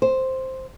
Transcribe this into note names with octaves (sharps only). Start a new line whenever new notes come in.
C5